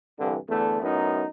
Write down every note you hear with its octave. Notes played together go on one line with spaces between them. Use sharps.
C2 G2 D3 E3
E2 D3 A3
F#2 A2 B3 D#4